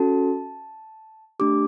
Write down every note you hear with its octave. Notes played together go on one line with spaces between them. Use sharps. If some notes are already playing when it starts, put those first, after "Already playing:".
Already playing: C#4 F#4 A4 A5
A3 D4 G4 D6